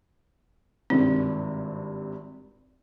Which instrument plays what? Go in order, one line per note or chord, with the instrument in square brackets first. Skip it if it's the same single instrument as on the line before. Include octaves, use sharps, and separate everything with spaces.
[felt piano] G#1 G2 C3 [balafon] C4